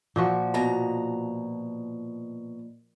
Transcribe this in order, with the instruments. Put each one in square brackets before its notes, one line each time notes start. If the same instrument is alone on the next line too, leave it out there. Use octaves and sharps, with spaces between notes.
[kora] A#2 F3 F#4
[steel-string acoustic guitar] B2 A#5